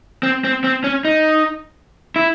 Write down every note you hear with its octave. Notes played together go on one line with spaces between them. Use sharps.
C4
C4
C4
C#4
D#4
E4